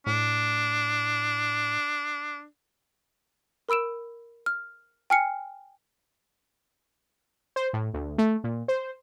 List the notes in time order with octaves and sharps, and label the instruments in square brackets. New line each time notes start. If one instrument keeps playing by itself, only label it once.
[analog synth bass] A2 [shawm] D4
[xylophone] A#4 B5 E6 D7 E7
F6
G5 G#5 F6 C7 C#7
[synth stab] C5
A2
D2
A3
A#2
C5